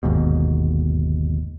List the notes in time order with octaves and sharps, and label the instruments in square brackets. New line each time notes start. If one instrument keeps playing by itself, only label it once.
[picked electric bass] G1 D#2 G#2 B2